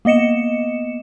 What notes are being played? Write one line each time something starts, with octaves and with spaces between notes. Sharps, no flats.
A#3 B3 D#5 C#7 E7